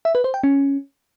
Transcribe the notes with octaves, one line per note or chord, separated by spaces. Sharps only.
E5
B4
C5
G5
C#4